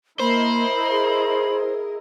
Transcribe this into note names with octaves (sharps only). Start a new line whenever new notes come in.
A#3 E4 A#4 C5 D#5 B5
G#4